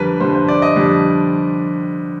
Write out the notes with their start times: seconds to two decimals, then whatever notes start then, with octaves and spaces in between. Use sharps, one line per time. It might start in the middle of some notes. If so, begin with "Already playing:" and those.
Already playing: F2 D3 G3 A#4 B4
0.20 F2 D3 G3 C5
0.35 C5
0.49 D5
0.62 D#5
0.76 F2 D3 G3